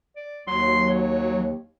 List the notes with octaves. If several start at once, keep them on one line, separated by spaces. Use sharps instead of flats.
D5
D#2 F#3 C6
C#5